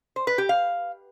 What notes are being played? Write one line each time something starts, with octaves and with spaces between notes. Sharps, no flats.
C5
B4
G4
F5